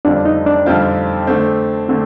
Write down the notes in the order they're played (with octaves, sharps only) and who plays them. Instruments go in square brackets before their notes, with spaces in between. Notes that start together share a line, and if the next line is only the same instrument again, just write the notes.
[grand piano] F2 D3 G3 C4 F4 [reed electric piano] D4
[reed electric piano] D#4
D4
[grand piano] F2 D3 G3 C4 F4
D3 A3 C4
[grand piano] D3 A3 [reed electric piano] C4